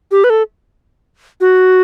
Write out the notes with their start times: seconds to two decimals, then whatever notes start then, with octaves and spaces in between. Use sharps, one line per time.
0.11 G4
0.24 B4
0.30 A4
1.41 F#4